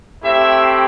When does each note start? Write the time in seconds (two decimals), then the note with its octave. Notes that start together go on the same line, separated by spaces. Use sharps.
0.23 A3 C4 E4 G4 E5